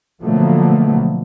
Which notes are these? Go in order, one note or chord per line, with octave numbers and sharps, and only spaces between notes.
B2 D3 F3 F#3 A3 A#3